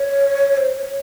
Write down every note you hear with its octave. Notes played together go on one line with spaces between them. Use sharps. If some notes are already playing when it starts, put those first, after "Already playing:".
Already playing: C#5
C5
C#5